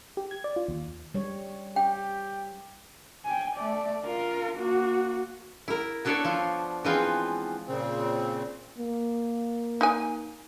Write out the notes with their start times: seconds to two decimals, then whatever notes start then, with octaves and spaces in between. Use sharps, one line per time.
0.17 G4
0.31 G#6
0.44 D5
0.56 F4
0.68 D#2
1.14 G3 C#5
1.76 G4 G5
3.25 G5 G#5
3.56 A3 D5
4.05 F4 A#4
4.57 A#3 F#4
5.68 E4 A#4
6.05 B3 D4 A4 C#5 D5 E5
6.25 F3 F4
6.85 E3 F3 G#3 B3 C4 F4
7.67 A#2 C#3 C4
8.79 A#3
9.81 D#4 G#5